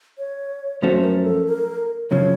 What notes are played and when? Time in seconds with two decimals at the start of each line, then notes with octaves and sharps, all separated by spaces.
0.18 C#5
0.82 F#2 F3 A3 C#4 F#4 C5
1.04 A#4
1.25 A4
1.47 A#4
2.11 F#2 C#3 F3 C#5